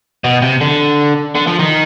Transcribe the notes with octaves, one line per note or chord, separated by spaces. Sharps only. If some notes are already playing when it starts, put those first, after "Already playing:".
B2
C3
D3
D3
F3
D#3